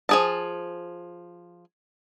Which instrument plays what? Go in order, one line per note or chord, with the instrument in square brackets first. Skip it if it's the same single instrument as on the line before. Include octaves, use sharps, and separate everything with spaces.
[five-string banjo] F3 G#4 A5